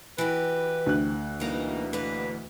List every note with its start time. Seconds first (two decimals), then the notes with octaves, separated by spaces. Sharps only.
0.18 E3 F#4 G4 B4
0.86 D2 F#6
1.40 B2 E3 G3 A#3 D#4
1.93 A#3 D4 B4